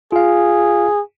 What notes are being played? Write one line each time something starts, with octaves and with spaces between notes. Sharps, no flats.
F4 G#4 F5